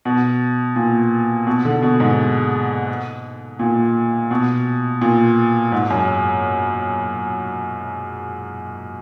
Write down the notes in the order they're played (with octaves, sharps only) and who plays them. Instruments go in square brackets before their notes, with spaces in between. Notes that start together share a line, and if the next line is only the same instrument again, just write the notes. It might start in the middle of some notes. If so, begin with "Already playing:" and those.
[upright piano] B2
A#2
B2
D3
B2
G#2
A#2
B2
A#2
G#2
F#2